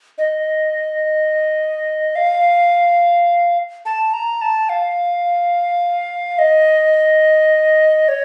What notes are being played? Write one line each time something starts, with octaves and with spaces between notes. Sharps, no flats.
D#5
F5
A5
A#5
A5
F5
D#5
C#5